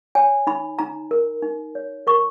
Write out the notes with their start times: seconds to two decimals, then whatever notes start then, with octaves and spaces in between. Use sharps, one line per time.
0.15 C#5 G#5
0.47 D#4 B5
0.79 D#4 A#5
1.11 A#4
1.43 D#4
1.75 C#5
2.07 A#4 C#6